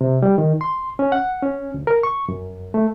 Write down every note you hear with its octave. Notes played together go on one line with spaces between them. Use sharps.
C3
G3
D#3
C6
C#4
F#5
C#4
D2
A#4
C#6
F#2
A3